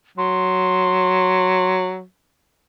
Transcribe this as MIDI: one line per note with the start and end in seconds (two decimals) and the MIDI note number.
0.18 2.03 54
0.18 1.74 84